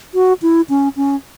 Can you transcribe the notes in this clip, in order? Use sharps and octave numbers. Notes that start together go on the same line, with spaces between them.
F#4
E4
C#4
C#4